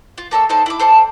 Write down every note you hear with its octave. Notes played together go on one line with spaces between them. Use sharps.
F4
A#3 A4 C#5 E6
D#4 A4 C5 D5
E4 B5 D6
A4 C5 D5 A5